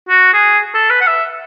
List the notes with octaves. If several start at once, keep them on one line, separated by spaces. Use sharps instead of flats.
F#4
G#4
A4
B4
F#5
E5